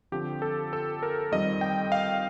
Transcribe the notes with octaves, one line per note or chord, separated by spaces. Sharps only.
D3 F3 C4 G4
A4
A4
A#4
F2 D#3 G3 C4 D#5
G5
F5